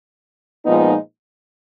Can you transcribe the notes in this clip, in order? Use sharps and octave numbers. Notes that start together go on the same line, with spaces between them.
A#2 F3 G#3 B3 D#4